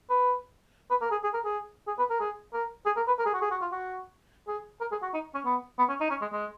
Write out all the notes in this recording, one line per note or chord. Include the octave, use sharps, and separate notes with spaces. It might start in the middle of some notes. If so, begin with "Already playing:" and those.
B4
B4
A#4
G#4
G#4
A#4
G#4
G#4
B4
A#4
G#4
A#4
G#4
A#4
B4
A#4
G#4
F#4
G#4
F#4
F4
F#4
G#4
A#4
G#4
F#4
D#4
C#4
B3
B3
C#4
D#4
C#4
G#3
G#3